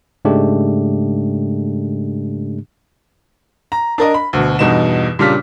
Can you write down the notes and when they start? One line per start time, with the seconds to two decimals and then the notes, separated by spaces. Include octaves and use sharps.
0.25 G#2 C#3 G#3 A3 D4 G4
3.72 A#5
3.98 D4 A#4 D#5
4.14 B5
4.33 D2 B2
4.59 E2 G2 B2 D#4 E7
5.19 A#2 C#3 G3 D4 F6 B6